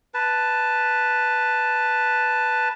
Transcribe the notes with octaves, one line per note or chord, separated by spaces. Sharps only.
B4 A5